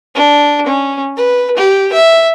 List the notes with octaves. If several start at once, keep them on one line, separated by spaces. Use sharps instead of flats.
D4
C#4
B4
G4
E5